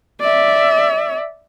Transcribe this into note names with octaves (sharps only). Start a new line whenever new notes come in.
D5 E5